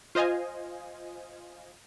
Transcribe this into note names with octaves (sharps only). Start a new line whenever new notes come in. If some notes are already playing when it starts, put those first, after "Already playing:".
F4 C5 D#5 F5 G#5